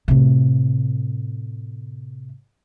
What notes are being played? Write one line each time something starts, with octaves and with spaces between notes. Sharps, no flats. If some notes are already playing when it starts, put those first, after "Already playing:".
A2 C3